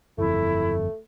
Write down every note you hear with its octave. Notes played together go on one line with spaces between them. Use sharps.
G1 F2 A3 E4